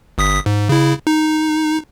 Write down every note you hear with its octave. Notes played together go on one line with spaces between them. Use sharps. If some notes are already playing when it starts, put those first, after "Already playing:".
G1 D#6 B6
G#2
C#3 E4
D#4